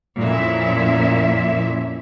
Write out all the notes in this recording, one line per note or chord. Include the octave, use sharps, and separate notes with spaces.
F2 A#2 F3 C#4 E4 E5